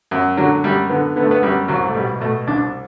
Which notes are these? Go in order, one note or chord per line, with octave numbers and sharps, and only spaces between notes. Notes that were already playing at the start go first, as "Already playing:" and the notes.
F#2
D3 F#3
F#2 G3
D3 B3
D3 B3
A3
B3
F#2 G3
C2 F#3
A3
B2 G3
B2 A3
C2 D4